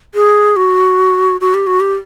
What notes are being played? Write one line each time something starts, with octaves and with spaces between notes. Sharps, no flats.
G#4
F#4
F#4
G4
F#4
G4